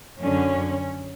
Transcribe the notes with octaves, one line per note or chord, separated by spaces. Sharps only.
F#2 D3 C#4